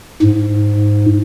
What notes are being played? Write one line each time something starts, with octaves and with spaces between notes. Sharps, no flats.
G#2